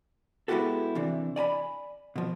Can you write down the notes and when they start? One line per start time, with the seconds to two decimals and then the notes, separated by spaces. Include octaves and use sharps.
0.48 G#3 B3 E4 F#4 G4 A4
0.95 C3 E3 D4
1.36 D5 G#5 A#5 B5
2.16 B2 F3